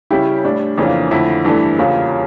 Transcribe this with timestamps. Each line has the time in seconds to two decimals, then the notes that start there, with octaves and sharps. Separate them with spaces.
0.11 C#3 G3 C#4 E4 G4
0.44 A2 G3 D4
0.78 F2 C#3 E3 A#3 D4
1.11 F2 D3 A3 E4
1.45 G2 E3 A3 D4
1.78 E2 C#3 G3 A#3 F4